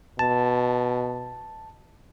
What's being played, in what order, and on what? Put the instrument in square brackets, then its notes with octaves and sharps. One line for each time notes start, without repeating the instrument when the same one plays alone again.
[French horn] B2 [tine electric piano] A5